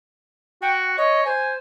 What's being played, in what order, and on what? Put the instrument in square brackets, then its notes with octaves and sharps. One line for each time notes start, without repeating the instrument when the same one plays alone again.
[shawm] F#4 [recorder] G5
[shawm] C#5 [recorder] D#5
[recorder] C5 [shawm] G#5